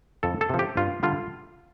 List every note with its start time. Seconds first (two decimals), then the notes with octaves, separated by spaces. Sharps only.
0.23 F2 A4
0.41 A4
0.49 C3 F3
0.59 G4
0.77 G2 F4
1.03 D3 G3 F4